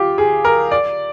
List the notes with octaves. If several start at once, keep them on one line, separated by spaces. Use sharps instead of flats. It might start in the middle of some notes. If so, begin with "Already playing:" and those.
Already playing: F4 G4
G#4
A#4
D5